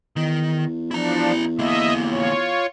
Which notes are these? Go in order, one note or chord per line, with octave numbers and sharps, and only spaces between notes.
E2 D#3
F3 D4 E4 A#5
D3 A#3 D#5 E5
F4 C#5